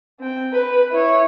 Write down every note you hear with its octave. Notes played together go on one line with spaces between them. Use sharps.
C4 G5
B4
E4 C#5